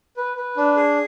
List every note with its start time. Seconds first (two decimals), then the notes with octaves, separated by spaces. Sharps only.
0.17 B4
0.37 B4
0.57 D4
0.76 G#4